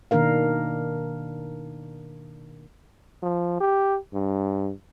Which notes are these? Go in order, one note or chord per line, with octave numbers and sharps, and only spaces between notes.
B2 D#3 A#3 D4 A#4 F5
F3
G4
G2